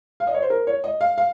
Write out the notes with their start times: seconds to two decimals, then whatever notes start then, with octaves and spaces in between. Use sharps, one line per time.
0.20 F5
0.27 D#5
0.34 C#5
0.42 C5
0.50 A#4
0.67 C#5
0.84 D#5
1.01 F5
1.18 F5